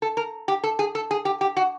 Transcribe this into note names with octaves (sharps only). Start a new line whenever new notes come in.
A4
A#4
G4
A4
G#4
A4
G#4
G4
G4
F#4